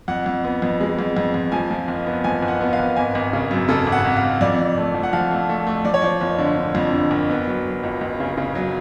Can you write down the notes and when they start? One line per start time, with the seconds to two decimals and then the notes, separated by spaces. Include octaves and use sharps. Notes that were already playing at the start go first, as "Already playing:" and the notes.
0.08 F2 F#5
0.26 F2
0.44 B3
0.62 F2
0.81 G#3
0.99 F2
1.17 F2
1.34 F2
1.52 F3 G#5
1.71 F3
1.88 F#1
2.07 B3
2.24 F3 G#5
2.42 F#1
2.48 F#5
2.61 B3
2.73 F5
2.79 F#1
2.96 G#1 G#5
3.15 G#1
3.33 C#3
3.51 F#2
3.68 C#3 A4
3.87 G#1
3.92 F#5
4.05 G#1
4.17 F5
4.23 G#1
4.41 F2 D5
4.59 F2
4.77 A3
4.94 F3
5.03 F#5
5.13 F3 F5
5.31 A3
5.49 A3
5.67 A3
5.85 F3 D5
5.94 C#5
6.02 F3 D5
6.21 F#1
6.38 D3
6.57 D3
6.75 F2
6.93 D3
7.11 F#1
7.30 B3
7.47 F#3
7.66 F#3
7.83 C#2
8.01 C#2
8.20 C#3
8.37 C#3
8.55 F#3